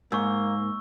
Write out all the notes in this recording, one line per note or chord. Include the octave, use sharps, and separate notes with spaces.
G#2 A#3 C#6 E6